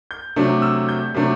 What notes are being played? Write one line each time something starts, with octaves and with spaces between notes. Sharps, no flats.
G6
C3 F#3 A3 D4
E6
G6
C3 F#3 A3 D4